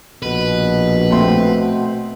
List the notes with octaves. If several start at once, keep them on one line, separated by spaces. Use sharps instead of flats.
A#1 B2 B4
A3 C4 C6